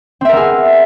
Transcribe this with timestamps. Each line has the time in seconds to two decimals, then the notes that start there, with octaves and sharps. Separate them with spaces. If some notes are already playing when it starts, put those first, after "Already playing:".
0.21 C4
0.25 E5
0.29 A#4
0.33 B3
0.37 G#4